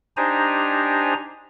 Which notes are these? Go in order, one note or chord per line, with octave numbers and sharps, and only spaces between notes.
D4 D#4 G4 C5 G#5 A#5